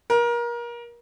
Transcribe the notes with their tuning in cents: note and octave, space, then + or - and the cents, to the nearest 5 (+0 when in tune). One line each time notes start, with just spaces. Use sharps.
A#4 +30